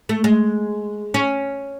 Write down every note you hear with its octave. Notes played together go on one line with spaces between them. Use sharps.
A3
G#3
C#4